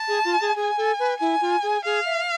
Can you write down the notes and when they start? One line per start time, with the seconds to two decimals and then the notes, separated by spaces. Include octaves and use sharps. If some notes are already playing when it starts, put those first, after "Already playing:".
Already playing: A5
0.08 G#4
0.25 F4
0.41 G#4
0.56 G#4 G#5
0.77 A4
0.99 B4
1.20 E4 G#5
1.41 F4
1.63 G#4
1.85 G#4 F5
2.05 E5